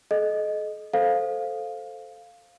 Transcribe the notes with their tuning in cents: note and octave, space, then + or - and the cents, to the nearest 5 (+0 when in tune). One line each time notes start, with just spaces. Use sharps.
A4 -45 D#5 -5
A4 +0 C5 +0 F5 +0